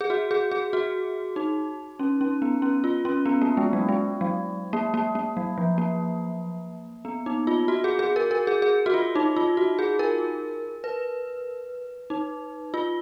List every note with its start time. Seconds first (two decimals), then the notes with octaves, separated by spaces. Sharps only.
0.01 G#4
0.10 F#4
0.31 G#4
0.51 G#4
0.73 F#4
1.36 D#4
1.99 C#4
2.21 C#4
2.42 B3
2.62 C#4
2.84 F4
3.05 C#4
3.26 B3
3.42 A#3
3.57 G#3
3.73 F#3
3.89 G#3
4.21 F#3
4.73 A#3
4.94 A#3
5.15 A#3
5.37 F#3
5.58 F3
5.78 A#3
7.05 B3
7.26 D#4
7.47 F4
7.68 F#4
7.84 G#4
7.99 G#4
8.16 A#4
8.31 A#4
8.47 G#4
8.62 G#4
8.86 F#4
8.94 F4
9.15 D#4
9.36 F4
9.57 F#4
9.79 G#4
9.99 A#4
10.84 B4
12.10 D#4
12.74 F4